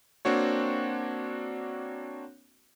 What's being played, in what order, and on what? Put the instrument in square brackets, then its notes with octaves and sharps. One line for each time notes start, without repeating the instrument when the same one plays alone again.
[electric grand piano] A#3 C4 D4 F#4 C#5